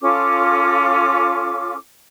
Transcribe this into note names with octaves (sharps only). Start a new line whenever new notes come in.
C#4 F4 A4 D6